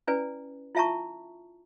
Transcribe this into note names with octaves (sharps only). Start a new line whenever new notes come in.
C#4 E4 B4 D5 G#5
E4 F4 E5 A5 A#5 C#6